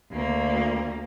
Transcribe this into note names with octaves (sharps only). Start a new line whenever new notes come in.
D2 A#3